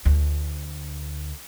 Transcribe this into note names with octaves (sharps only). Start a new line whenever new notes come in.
D2